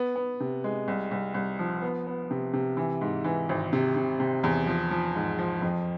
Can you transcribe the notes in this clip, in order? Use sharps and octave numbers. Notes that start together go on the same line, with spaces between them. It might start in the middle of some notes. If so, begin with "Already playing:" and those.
Already playing: B3
B3
C3
G#3
C2
C2
C2
F3
B3
B3
C3
C3
E3
G#2
E3
G#1
C3
C3
C3
E2
F3
F3
G#2
F3
F2